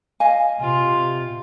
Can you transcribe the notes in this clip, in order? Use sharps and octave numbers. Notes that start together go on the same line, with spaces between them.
D#5 F5 G#5
C3 F4